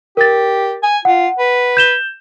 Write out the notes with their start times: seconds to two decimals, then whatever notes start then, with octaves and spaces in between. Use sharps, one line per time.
0.17 G4 A#4 A6
0.83 G#5
1.05 F4 F#5
1.39 B4
1.77 G6 E7 G7